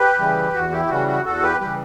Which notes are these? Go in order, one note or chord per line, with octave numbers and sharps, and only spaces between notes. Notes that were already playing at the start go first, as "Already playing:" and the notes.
Already playing: G4 B4
C#3 E3 G3
E2 F#4
E4 G4
G4
C#3 E3 G3 F#4
F#4
E2 F#4 A4
G4 B4
C#3 E3 G3 G4 B4